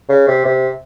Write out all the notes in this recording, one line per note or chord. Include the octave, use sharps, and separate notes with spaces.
C#3
C3
C3